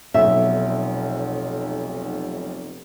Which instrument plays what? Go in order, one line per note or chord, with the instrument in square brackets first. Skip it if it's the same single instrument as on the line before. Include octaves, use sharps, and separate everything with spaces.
[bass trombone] F1 [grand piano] B1 [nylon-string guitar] E5